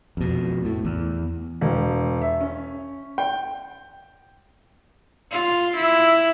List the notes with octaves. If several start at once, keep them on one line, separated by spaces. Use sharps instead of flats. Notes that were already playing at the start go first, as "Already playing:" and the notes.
F2 B2
A2
E2
E1
E5
C#4
G5
F4
E4